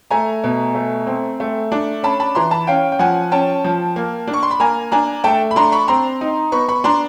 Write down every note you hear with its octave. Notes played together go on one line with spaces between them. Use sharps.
A3 G#5 A#5
B2
A3
C4
A3
D4
C#4 A5 B5
A5 B5
E3 A#5 C6
A5 B5
C#4 F5 G5
G5
F3 F#5 G#5
C#4 G5 A5
F3
A#3
D4
C#6
C6
B5
A#3 G#5 A#5
D4 G#5 A#5
A3 G5 A5
B5
D4 A#5 C6
B5 C#6
C4 A#5 C6
D#4
B3 B5 C#6
B5 C#6
D4 A#5 C6